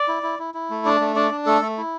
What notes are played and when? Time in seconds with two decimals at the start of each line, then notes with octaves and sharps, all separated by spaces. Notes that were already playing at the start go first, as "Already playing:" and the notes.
Already playing: D5
0.08 E4
0.23 E4
0.39 E4
0.54 E4
0.70 A3
0.85 D4 D5
1.00 A3
1.16 D4 D5
1.31 D4
1.46 A3 A4
1.62 A3
1.78 E4